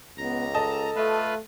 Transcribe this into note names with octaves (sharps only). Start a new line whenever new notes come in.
C#2 B3 A#5
A4 D#5 A5
A3 F4 B4